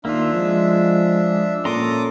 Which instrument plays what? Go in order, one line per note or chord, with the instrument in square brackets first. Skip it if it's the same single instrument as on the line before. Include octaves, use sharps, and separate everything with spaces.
[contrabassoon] D#2 [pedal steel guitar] A#3 F4 [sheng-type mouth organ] D4 E5
[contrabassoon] F3 [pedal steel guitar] G#3
[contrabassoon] A#2 [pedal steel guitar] C#4 A#5 C6 [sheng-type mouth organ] A4 D6 D#6